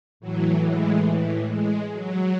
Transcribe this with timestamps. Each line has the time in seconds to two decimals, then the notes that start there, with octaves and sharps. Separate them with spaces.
0.20 A2 E3 F#3
0.64 G#3
1.49 G#3
1.92 F#3